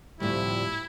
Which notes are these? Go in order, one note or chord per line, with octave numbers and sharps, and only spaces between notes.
D2 A2 C3 F3 G3 E4